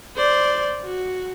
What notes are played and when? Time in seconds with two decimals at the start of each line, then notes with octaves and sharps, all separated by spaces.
0.16 C5 D5
0.84 F#4